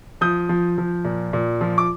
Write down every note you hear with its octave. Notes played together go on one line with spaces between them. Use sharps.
F3 D#6 G6
F3
F3
A#2
A#2
F3
D6